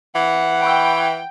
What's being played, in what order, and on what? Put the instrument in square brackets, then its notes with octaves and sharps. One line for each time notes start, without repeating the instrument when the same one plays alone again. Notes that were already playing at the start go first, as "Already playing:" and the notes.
[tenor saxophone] E3 [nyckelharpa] F#5
[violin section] G5 [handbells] B5 C#6 E6